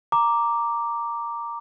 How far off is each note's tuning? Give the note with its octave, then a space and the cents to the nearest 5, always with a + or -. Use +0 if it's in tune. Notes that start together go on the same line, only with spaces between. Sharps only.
A#5 +0 D6 +0